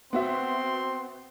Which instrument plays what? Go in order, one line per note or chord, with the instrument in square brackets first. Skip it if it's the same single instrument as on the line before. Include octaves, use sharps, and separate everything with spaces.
[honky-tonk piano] B3 F#4 E5 [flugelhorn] C4 [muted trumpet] C6